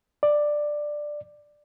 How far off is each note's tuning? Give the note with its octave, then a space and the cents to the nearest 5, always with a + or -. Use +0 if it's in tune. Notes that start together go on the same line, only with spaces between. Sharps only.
D5 +10